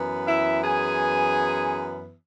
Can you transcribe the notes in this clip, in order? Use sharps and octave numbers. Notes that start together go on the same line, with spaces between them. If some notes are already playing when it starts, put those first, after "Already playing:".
Already playing: F#2 E3 B3
E4 E5
G#4 G#5